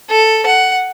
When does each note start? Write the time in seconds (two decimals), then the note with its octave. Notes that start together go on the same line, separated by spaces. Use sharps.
0.10 A4
0.46 F#5